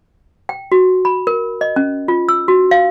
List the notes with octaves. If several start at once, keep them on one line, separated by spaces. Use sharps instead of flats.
G5
F#4
B5
A#4
D#5
C#4
F4
E6
F#4
F5